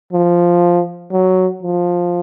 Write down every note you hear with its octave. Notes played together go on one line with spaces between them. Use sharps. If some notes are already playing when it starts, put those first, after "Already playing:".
F3
F#3
F3